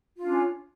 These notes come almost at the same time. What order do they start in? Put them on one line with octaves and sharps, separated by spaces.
F4 D4 C#4